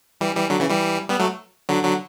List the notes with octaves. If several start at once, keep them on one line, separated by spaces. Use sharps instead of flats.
E3 G3
E3 G3
D3 F#3
C#3 E3
E3 G3
G3 B3
F#3 A3
D3 F#3
D3 F#3